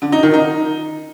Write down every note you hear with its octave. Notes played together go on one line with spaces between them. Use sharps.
D3
D#4
D#3
D#4